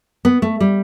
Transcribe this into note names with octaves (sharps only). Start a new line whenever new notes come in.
B3
A3
G3